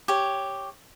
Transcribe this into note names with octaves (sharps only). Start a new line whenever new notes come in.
G4 C#5